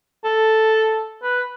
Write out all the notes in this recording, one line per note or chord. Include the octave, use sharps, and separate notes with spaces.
A4
B4